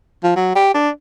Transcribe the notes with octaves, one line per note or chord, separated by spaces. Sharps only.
F3
F#3
G4
D4